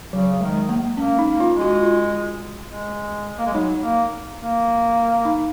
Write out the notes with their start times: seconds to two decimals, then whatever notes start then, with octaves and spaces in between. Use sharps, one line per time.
0.12 C#3 F#3
0.41 D#3 G#3
0.69 A#3
0.97 A#3 C#4
1.19 D#4
1.27 A#3
1.40 F4
1.55 G#3
1.61 F#4
1.83 F4
2.69 G#3
3.39 A#3
3.46 G#3
3.53 F#3 D#4
3.82 A#3
4.39 A#3
5.25 D#4